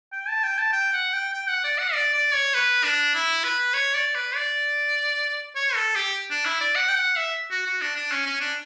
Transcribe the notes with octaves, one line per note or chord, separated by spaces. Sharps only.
G5
A5
G5
A5
G5
F#5
G5
G5
F#5
D5
F#5
D5
D5
C#5
B4
D4
E4
B4
C#5
D5
B4
D5
C#5
A4
G4
D4
E4
D5
F#5
G5
F#5
E5
F#4
F#4
D4
D4
C#4
C#4
D4